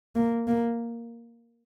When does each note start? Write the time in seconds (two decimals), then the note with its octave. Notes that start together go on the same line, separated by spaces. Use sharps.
0.16 A#3
0.48 A#3